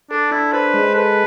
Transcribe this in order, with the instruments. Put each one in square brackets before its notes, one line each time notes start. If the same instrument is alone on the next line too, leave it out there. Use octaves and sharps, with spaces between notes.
[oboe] D4 [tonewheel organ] A4
[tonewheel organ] D4 [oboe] E4
[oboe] B4 [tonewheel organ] C5
[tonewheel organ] G#3
[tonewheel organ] A4 [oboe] B4